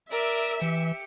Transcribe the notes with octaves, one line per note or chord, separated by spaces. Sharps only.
A#4 D5 E5
E3 G4 C#7